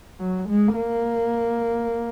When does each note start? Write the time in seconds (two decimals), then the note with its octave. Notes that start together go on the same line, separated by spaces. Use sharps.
0.20 F#3
0.49 G#3
0.76 A#3